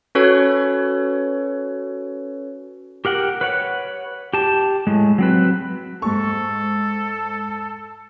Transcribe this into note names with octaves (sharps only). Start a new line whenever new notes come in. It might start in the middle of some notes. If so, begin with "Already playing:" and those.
C#4 F#4 A4 B4 C#5
G4 A#4 F#5 G5
B4 C#5 F#5
G4 A5
A2 G#3
F#3 C4 B4
G#2 A4 C#6